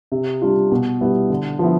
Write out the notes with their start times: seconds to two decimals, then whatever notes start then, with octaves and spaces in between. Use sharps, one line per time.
0.12 C3
0.42 G3 D4 F4
0.72 B2
1.01 G3 B3 E4
1.30 D3
1.59 F3 B3 E4